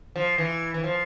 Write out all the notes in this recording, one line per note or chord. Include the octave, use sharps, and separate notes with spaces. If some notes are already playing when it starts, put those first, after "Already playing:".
F3
E3
E3
F3